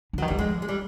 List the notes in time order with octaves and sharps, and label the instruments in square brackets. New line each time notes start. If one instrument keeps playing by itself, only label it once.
[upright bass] D3
[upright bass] D#3 [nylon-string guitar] F#3
[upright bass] E3 [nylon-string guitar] G3
[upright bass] F3 [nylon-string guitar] G#3
[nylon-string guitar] G#3
G3